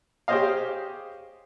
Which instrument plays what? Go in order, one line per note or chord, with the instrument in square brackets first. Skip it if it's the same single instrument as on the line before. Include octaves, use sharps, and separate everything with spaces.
[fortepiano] G4 G#4 C5 C#5 D#5 F5